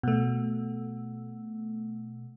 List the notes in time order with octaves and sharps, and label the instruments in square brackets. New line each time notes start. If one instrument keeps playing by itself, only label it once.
[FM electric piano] B2 A3